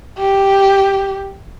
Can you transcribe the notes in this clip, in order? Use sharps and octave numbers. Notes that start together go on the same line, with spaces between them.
G4